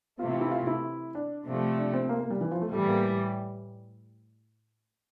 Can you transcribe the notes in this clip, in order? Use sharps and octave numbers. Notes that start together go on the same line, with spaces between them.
C3 E3 A3 C4 F4
F4
E4
F4
E4
D4
C3 F3 A3
D4
C4
A#3
A#3
G3
E3
F3
A3
A2 E3 G3 A3
A#3